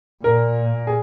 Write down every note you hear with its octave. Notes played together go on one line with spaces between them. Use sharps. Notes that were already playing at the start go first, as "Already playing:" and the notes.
A#2 A#4
G#4